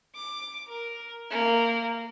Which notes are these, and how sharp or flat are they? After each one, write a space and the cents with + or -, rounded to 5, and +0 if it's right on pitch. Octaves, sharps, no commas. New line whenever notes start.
D6 +15
A#4 +5
A#3 -15